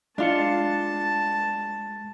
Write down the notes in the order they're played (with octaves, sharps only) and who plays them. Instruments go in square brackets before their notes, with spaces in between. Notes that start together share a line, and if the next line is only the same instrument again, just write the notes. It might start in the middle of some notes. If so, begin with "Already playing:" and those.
[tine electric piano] G#3 C#7 [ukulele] D4 F4 [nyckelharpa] A5